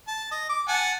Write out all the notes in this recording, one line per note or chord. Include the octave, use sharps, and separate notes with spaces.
A5
D#5
D6
F#5 G#5 A5